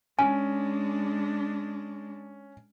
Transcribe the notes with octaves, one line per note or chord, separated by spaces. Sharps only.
G#3 C#4 D4 G#5